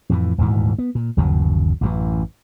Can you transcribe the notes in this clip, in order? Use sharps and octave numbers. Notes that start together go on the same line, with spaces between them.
F2 A2 E3
D#1 D2 G#2 E3
B3
A#2
G1 D#2 C#3 F#3
A1 F#2 D3 E3